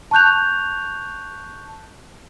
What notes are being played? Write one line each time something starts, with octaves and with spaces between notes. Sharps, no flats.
A5 C#6 F#6 G6 F7